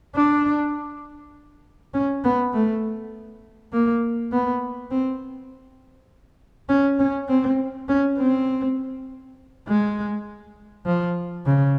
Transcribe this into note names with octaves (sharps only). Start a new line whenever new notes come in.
D4
C#4
B3
A3
A#3
B3
C4
C#4
C#4
C4
C#4
C4
G#3
F3
C#3